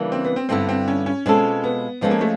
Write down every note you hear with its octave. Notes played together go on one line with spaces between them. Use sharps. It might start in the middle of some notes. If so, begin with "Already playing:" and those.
Already playing: C#3 E3 G3 A#3 D4
C4
B3
C4
G2 D3 G3 B3 C4 E4
C4
C#4
C#4
B2 G#3 C4 C#4 F4 A4
B3
F3 G#3 B3 C#4 F4 A4
A#3
A3